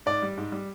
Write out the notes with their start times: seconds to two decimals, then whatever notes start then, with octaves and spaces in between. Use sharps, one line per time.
0.06 G#2 D5
0.22 G3
0.37 G#2
0.52 G3